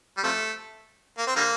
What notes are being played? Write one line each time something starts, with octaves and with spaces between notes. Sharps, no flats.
G3
C3 F3 A3
A#3
C4
D3 G3 A#3